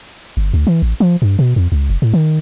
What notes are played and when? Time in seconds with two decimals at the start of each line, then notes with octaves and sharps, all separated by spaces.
0.37 G1
0.53 D2
0.67 E3
0.82 A1
1.00 F3
1.22 G2
1.39 B2
1.56 F2
1.72 C#2
1.90 F1
2.02 A2
2.13 D#3